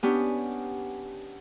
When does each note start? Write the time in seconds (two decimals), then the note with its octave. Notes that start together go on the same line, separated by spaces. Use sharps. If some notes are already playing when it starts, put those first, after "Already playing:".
0.03 B3 C#4 D4 G4